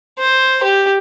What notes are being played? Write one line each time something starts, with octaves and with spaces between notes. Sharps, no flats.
C5
G4